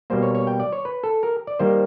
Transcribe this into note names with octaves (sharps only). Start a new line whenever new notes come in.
B2 G3 A#3 C5
C#5
C#5
G5
D5
C#5
B4
A4
A#4
D5
D#3 G3 A#3 C5